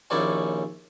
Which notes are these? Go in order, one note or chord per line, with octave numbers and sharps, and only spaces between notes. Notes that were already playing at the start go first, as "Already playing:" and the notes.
A#1 D#2 C#4 E4 D5 G#5